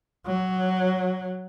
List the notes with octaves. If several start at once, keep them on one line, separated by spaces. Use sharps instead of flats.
F#3